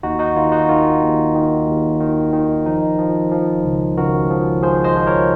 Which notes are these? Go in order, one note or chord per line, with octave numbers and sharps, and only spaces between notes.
D#2 D#4 F#4
D#4 F#4
D#3 F4
D#4 F#4
D#3 F4
D#2
D#3
D#2
D#3
D#3
F3 D#4
F3
F3
C#2
C#2 F#4 A#4
F3
F3 G#4 C5
C5 D#5
F3
A#4 C#5